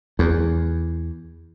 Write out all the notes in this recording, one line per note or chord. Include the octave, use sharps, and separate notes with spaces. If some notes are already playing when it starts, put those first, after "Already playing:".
E2